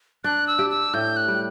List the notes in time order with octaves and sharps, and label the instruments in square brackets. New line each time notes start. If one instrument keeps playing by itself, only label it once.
[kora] D4 [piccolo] F#6
[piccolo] E6
[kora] G4
[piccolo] E6
[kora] A2 [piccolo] G6
[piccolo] F#6
[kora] G3